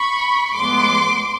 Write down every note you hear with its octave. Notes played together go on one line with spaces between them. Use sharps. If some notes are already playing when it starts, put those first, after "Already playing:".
Already playing: B5 C#6
A2 F3 G#3 B3 C6 D6